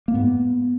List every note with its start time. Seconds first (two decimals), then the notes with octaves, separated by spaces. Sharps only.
0.08 A#3
0.14 G#2 B3